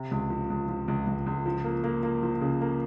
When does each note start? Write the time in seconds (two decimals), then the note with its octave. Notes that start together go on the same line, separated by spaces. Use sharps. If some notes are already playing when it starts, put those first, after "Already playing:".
Already playing: C3
0.11 C#2
0.30 F3
0.50 C#2
0.68 F3
0.88 C#2
1.07 C#2
1.26 C#2
1.46 F3
1.64 A#3
1.84 A#3
2.03 A#3
2.23 F3
2.41 C#3
2.61 A#3